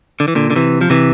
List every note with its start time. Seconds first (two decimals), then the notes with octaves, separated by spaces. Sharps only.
0.20 D3
0.28 E3
0.35 A#2 D3
0.51 D3
0.56 C3 E3
0.81 F3
0.90 C3 E3